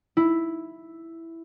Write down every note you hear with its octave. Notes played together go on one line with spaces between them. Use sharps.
E4